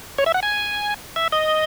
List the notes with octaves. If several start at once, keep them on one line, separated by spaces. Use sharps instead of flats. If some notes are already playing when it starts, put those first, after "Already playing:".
C#5
E5
F#5
G#5
E5
D#5